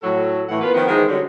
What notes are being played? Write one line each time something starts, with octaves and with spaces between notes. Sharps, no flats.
A2 F#3 A4
A2 E3 F#5
A#3 B3 F4 B4
D#3 F3 B3
D#3 E3 G#3 D#4 A#4 C5
D3 F#3 G3 C#4